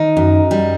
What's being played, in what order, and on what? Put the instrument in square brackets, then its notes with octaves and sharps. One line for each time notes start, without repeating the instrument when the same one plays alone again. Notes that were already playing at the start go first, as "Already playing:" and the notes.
Already playing: [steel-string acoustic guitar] D#3 D#4
F#2
G3